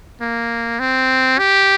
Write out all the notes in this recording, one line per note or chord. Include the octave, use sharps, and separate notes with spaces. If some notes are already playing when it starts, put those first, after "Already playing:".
A#3
C4
G4